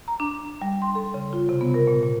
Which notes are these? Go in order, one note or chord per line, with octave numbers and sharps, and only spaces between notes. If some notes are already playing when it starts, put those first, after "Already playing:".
A#5
D4
G3
C6
A4
C#3
F4
C3
B3
A#4
A#2
A#2